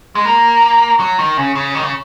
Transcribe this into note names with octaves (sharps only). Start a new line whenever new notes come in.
G#3
A#3
F#3
D#3
C#3
C#3
D#3
C#3